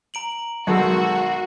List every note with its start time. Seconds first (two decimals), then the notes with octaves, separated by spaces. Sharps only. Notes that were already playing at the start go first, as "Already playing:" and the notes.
0.14 A#5 D7 F#7
0.67 B1 D#3 G#3 F#4 A4 E6